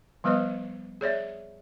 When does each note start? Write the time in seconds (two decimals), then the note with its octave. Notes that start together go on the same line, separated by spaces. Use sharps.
0.24 F3 G3 B3 B4 C5 D#5
1.01 G#4 C#5 D5 E5